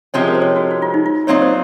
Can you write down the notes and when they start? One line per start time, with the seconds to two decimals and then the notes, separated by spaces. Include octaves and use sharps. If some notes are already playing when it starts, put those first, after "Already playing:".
0.14 C3 F3 G#3 C#4 C#5
0.21 G#4
0.28 A#4
0.35 C5
0.42 C#5
0.56 F#4
0.71 F#4
0.82 F4
0.94 D#4
1.06 F4
1.27 A#2 F#3 C4 D#4 C#5
1.42 C5